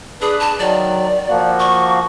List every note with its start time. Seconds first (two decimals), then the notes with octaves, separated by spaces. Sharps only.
0.21 D4 G#4 B4
0.39 A5
0.59 D#3 F#3 D5
1.29 F3 A#3 F#4
1.60 C#6